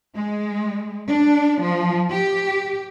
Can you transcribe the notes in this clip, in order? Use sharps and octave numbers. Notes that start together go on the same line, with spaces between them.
G#3
D4
F3
G4